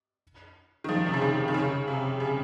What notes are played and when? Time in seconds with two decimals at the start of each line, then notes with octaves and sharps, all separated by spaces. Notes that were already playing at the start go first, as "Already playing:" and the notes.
0.84 D#3
0.89 F3
1.07 C3
1.14 C#3
1.21 D#3
1.48 D#3
1.54 C#3
1.88 C3
2.20 C#3